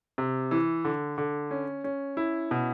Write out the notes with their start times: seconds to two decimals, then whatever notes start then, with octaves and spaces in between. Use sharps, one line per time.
0.18 C3
0.51 E3
0.85 D3
1.18 D3
1.51 C#4
1.84 C#4
2.17 E4
2.51 B2